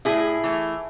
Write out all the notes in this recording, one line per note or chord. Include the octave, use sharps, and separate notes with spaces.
A2 E4 G#4
E3 A3